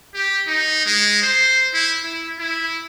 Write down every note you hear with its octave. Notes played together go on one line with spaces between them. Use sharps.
G4
D#4
G#3
C5
E4
E4
E4